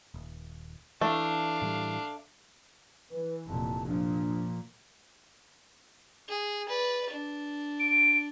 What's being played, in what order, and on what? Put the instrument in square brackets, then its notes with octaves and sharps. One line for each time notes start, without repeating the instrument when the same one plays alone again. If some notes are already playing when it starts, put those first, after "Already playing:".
[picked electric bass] D#1
[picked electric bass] E3 [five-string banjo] A3 [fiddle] D4 F5
[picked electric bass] A2 E3 G3
[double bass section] E3 [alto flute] B4
[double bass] F1 A#2 [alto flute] A5
[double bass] A#2 [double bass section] F3 [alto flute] D4
[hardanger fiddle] G#4
B4 D5
D4
[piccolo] D7